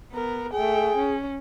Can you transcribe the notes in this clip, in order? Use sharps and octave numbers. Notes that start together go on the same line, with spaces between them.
B3 A#4
A3 G#4 G5
C#4